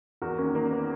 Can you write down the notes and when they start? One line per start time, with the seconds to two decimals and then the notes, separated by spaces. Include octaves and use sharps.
0.22 E2 F#4 A#4
0.38 A#3 C#4
0.44 D#3
0.55 A#3
0.66 D#3
0.71 B3